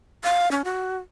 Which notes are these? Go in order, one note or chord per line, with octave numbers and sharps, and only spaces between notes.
F5
C#4
F#4